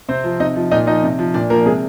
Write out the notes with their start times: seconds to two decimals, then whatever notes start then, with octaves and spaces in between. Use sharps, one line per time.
0.09 C3 C4 C5
0.24 F3
0.40 C3 D#4 D#5
0.56 F3
0.71 A#2 D#4 D#5
0.87 F3 D#4 D#5
1.03 C3
1.19 F3
1.34 A#2 D4 D5
1.50 F3 A#3 A#4
1.66 C3 G#3 G#4